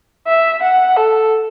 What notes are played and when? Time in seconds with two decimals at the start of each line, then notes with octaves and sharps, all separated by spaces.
0.27 E5
0.63 F#5
0.97 A4